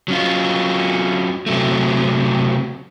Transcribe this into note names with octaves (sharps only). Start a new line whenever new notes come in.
F#3 C#4 F4
C3 F#3 A3